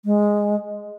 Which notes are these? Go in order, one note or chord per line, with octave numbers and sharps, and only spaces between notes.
G#3